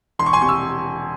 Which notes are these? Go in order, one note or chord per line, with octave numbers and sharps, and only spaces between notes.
E1 C6
C#6
G#5 C6
C3 C#6
E6